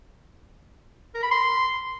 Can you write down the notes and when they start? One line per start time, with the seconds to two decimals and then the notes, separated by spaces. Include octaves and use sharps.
1.14 A#4
1.23 B5
1.31 C6